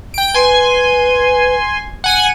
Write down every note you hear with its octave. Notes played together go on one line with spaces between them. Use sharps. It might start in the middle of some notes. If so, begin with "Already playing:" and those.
G5 D7
B4 G#5 C6
F#5 G#5 D#7